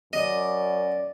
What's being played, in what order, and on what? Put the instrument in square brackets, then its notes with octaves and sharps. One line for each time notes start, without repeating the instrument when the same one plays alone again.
[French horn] F#2 [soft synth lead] D5 [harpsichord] D#5